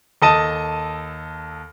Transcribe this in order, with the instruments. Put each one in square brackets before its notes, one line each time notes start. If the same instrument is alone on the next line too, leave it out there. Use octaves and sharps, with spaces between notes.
[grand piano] D#2 A4 D#5 A5 D#7